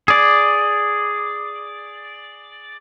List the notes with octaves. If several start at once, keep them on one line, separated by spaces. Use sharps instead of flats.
G#4 D5